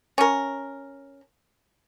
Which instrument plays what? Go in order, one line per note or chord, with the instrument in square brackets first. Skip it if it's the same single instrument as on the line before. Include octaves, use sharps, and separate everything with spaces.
[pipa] C#4 A#4